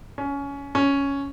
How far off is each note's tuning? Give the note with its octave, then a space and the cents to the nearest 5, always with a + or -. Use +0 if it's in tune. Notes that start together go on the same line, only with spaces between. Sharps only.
C#4 +20
C#4 +5